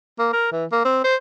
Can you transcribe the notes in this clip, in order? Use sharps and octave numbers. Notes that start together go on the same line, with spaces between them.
A#3
A#4
E3
A#3
C4
C5